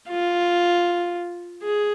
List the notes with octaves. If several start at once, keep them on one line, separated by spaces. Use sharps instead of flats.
F4
G#4